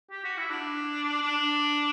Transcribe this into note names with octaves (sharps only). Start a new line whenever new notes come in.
G4
F#4
E4
D4
D4